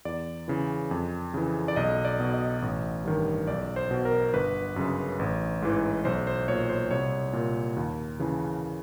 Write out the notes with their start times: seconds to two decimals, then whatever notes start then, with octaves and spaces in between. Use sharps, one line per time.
0.05 E2 D5
0.48 C#3 E3
0.91 F2
1.34 C#3 E3
1.68 D5
1.76 B1 D#5
2.05 D5
2.20 B2
2.34 D#5
2.62 A1
3.05 G2 D#3
3.47 B1 D5
3.76 C5
3.91 B2
4.05 A#4
4.33 G1 B4
4.76 F#2 C#3
5.19 A1
5.62 G#2 E3
6.05 B1 C5
6.27 C5
6.48 A#2 C#5
6.69 C5
6.91 C2 C#5
7.33 A#2
7.77 D#2
8.20 C#3 E3